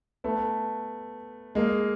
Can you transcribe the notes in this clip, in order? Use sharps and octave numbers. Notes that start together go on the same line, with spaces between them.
A3 B3
G#3 A#3